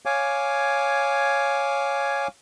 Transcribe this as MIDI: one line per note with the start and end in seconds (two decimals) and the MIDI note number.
0.05 2.28 73
0.05 2.28 77
0.05 2.28 80
0.05 2.28 86